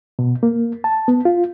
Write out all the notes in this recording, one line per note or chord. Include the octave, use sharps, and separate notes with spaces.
B2
A#3
A5
B3
F4